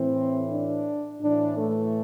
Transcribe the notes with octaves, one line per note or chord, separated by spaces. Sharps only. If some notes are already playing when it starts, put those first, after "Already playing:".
Already playing: A2 E3 C4
D4
A2 E3 D4
A3